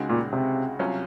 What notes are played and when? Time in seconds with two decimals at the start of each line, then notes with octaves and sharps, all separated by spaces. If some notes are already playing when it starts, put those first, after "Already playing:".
Already playing: C#2 C#3 G#3 D#4 F#4
0.09 A#2
0.33 C3
0.79 C2 C3 F#3 C#4 F4